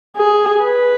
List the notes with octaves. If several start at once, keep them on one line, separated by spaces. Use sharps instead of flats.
G#4
B4